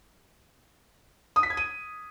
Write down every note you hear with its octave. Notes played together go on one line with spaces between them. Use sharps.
D#6
B6
G#6
D#7